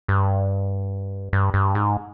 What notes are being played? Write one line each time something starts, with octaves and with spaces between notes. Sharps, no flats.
G2
G2
G2
G#2